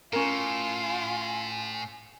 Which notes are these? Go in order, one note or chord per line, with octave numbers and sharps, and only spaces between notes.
A2 C#4 F4 A#4 G#5